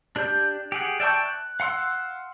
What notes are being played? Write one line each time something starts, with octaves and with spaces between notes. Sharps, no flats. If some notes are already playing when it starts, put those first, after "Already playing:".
D4 G4 D5 G6
G4 G#4 F#5
D5 E5 G5 A5 C#6
F#6
F5 F#5 C6 E6 F#6